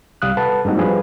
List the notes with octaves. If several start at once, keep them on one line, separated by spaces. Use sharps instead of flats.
C2 G3 F5 D#6 F#6
A4 B4 F#5 A5
G2 G#3 A#3 C4 D#4 F#4
F3 G3 D4 G#4 B4